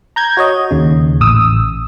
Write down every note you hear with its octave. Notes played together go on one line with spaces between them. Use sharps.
A#5 G6 G#6
F#4 C#5 D#5
D#2 C#3
A1 D#6 E6